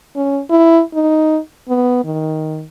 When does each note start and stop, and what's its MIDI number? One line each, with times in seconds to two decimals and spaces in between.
0.16 0.40 61
0.50 0.81 64
0.94 1.39 63
1.68 2.04 59
2.04 2.64 51